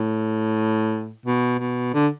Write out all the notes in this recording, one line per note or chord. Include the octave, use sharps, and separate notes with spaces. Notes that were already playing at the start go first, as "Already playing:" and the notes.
Already playing: A2
B2
B2
D3